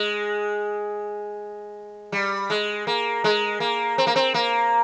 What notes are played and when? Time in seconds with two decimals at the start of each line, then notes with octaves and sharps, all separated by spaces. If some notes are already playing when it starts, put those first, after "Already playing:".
Already playing: G#3
2.12 G3
2.50 G#3
2.87 A#3
3.24 G#3
3.60 A#3
3.98 C4
4.07 A#3
4.16 C4
4.34 A#3